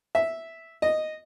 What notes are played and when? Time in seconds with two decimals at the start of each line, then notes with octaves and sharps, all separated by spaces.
0.15 E5
0.82 D#5